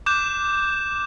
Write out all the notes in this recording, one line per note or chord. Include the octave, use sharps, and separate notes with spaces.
D6 F#6 G6 E7